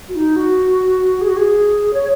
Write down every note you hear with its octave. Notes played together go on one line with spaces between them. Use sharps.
F#4
D#4
F#4
G#4
F#4
G#4
C#5